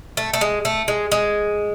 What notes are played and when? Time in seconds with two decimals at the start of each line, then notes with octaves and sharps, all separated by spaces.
0.17 A3
0.33 A3
0.41 G#3
0.65 A3
0.88 G#3
1.12 G#3